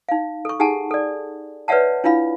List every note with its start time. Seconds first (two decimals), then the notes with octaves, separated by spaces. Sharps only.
0.09 D#4 F5
0.45 A4 C#6
0.60 D#4 G4 G#4 F#5 G#5 A5
0.91 A4 D5
1.68 B4 C#5 D5 E5 F#5 A5
2.04 D4 E4 F4 F5 B5